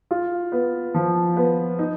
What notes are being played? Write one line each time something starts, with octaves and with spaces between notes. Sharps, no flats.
F4
B3
F3
B3
D#4